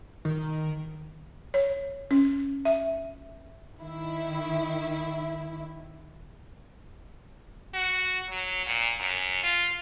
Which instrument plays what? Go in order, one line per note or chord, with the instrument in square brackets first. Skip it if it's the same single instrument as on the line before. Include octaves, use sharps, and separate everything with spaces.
[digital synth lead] D#3
[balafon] C#5
C#4
E5
[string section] D#3 E4
[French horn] F#4
F#3
A#2
F#2
F4